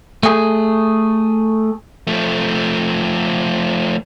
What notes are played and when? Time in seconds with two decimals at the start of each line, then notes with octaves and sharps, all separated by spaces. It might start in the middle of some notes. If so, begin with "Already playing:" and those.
0.23 A3 G#4
2.07 F3 A3